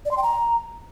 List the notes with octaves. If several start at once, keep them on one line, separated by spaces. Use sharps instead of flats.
D5
C6
G5
A#5